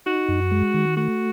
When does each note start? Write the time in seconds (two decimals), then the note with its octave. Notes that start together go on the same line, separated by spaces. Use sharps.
0.06 D#4 F#4
0.29 F#2
0.51 G#3
0.74 D#3
0.97 A3 F#4